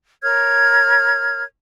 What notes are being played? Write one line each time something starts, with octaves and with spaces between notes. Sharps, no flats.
A#4 C#5 F6 G#6